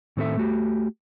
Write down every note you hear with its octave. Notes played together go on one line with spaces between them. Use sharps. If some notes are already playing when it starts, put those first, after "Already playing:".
A2 D#3 C4 E4 A4 E5
A3 F#4 G4